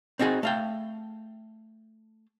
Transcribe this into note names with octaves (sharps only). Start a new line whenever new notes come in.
C4 D#4 F#4 G#4
A3 F5 G5